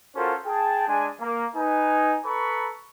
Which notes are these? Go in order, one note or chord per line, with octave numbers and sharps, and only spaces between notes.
C#4 F4 F#4 A4 A#4 C5
G#4 G5 A5
G#3 D4 G#5
A#3
D#4 B4 G#5
A4 B4 A#5 B5 C#6